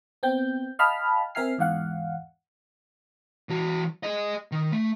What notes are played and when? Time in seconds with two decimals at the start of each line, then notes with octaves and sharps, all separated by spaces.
0.23 B3 C4 G5 G6
0.79 D#5 F5 G5 A5 B5 F6
1.35 C4 A#4 E5 G#5 F6 C7
1.58 E2 G#2 F5 F#5
3.49 E3 F#4
4.03 G#4 D#5
4.52 D#3
4.72 A3